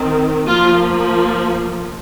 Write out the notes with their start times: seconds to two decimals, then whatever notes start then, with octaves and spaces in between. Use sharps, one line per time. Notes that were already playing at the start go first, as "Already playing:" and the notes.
Already playing: D#3 C4
0.47 F3 A#3 F4